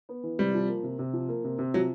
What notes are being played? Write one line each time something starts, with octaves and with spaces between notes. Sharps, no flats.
B3
E3
C3 G3
F3
A#3
C3
C3
F3
A#3
C3
C3
F3 F#3